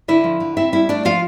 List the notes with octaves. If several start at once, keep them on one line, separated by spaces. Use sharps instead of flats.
D3 E4 E5
F3
D3
C4 E4 E5
G3 E4 E5
A3 D4 D5
F3 F4 F5